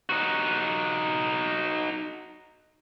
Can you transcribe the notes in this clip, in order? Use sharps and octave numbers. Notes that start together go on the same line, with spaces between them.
D#4 F#4